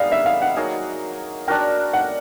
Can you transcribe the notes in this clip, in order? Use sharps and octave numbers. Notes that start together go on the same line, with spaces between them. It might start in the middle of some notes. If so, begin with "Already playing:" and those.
Already playing: G3 B3 D#4 G#4 F5
E5
F5
F#5
F#3 A#3 D#4 G#4
D4 F#4 A#4 G5
F#5